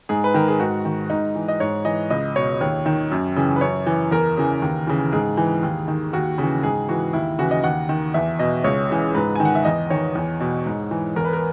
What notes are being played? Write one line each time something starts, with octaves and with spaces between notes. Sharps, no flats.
G#2 G#4
B4
D#3 A#4
G#4
G#2 F#4
D#3
G#2 D#4
E3
D#5
G#2 C#5
E3 D#5
C#2 D#5
B2 C#5
D#2 C#5
D#3
F#2
C#3 E3
B4
F#2 C#5
E3
E2 A#4
C#3 E3
D#2
C#3 E3
G#2 G#4
E3
D#2
D#3
D#2 F#4
C#3 E3
G#2 G#4
E3 F#4
D#2 E4
C#3 E3 F#4
D#5
D#2 F#5
D#3
E2 E5
B2 D#5
C#2 C#5
C#3 E3
G#2 B4
D#3 G#5
F#5
E5
E2 D#5
D#3 C#5
E2
B2
G#2
E3
E2 A#4
B4
A#4